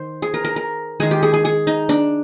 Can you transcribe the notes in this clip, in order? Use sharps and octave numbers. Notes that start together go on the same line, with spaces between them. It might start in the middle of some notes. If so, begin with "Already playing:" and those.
Already playing: D#3 C5
G#4
A#4
A#4
A#4
D#3 G#3 G#4
G4
G#4
G#4
G#4
D#4
D4